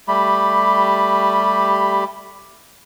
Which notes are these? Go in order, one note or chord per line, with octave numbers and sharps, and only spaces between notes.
G3 A3 G4 B5